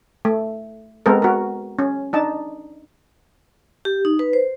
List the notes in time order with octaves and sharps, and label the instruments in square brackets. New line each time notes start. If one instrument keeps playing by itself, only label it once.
[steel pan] A3
G#3 B3 C4 A4 A#4
F#4 A#4
C#4
D4 D#4 A5
[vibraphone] G4
D#4
B4
C5